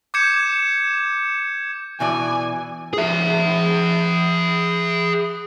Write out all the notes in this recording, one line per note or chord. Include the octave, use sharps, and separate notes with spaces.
D6 G6 G#6 C#7 E7
B2 E3 D5 G#5
G#4 E5